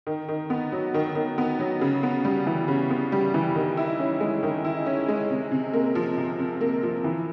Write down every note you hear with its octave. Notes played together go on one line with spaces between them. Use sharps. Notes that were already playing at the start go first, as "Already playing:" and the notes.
D#3
D#3
B3
F#3
D#3
D#3
B3
F#3
C#3
B3
G3
E3
C#3
B3
G3
E3
D#3
E4
C#4
G#3
D#3
E4
C#4
G#3
C3
C3
A#3
F3
C3
C3
A#3
F3
E3